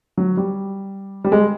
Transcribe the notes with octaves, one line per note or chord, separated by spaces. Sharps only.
F#3
G3
G3
G#3